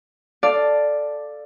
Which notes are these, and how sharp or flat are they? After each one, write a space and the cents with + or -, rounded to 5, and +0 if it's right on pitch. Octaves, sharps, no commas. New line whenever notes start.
A4 +0 D5 +5 F5 +0